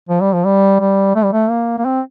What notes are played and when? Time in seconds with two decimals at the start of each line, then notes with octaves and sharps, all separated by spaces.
0.09 F3
0.21 G3
0.33 F3
0.45 G3
0.80 G3
1.15 A3
1.24 G3
1.32 A3
1.50 A#3
1.78 A#3
1.85 C4